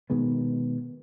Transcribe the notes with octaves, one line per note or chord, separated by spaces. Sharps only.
B2 D#3 G#3 B3